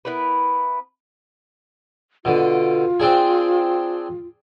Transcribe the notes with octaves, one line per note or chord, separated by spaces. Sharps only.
B3 E4 A#4 B4
B2 D3 F4
C4 D4 G#4